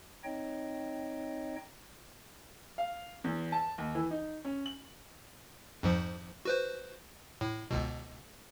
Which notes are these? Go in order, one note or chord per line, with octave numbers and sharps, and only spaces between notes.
C4 D#4 C#5 D#5 G5
F5
E2
A5
D#2
E3
D#4
C#4
F#7
F2 G#2 F3
F#4 B4 C5
A2
G1 C#2 B2